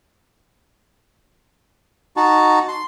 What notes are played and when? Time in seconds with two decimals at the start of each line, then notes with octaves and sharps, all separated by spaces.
2.17 D#4 F#4 A5
2.68 C6